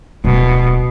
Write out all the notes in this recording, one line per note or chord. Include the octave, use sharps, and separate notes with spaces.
D1 B2